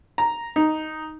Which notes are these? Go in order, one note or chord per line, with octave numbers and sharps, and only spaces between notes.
A#5
D#4